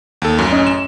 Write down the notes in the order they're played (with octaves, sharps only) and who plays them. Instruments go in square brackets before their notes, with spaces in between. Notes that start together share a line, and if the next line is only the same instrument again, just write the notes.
[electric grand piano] D#2 A4
A1 F#2
[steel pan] C#4 D#5
[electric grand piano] E7